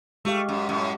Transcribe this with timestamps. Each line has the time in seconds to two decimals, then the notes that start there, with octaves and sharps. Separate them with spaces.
0.25 G#3 A3 G4 F5
0.49 F#2
0.69 F#2 A2